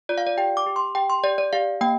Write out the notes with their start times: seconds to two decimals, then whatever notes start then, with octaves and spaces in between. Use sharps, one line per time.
0.09 F4 D5
0.18 F5
0.27 D5
0.37 G4 G5
0.57 D6
0.66 G4
0.76 C6
0.95 G4 G5
1.10 C6
1.24 G4 D5
1.38 D5
1.53 G4 F5
1.81 A#3 G5